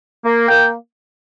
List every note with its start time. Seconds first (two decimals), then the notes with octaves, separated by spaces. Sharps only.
0.24 A#3
0.48 A#3 G5